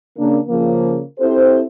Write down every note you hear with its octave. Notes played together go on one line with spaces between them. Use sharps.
C#3 A#3 D4
C#3 F3 A#3
C4 E4 G4 A4 C5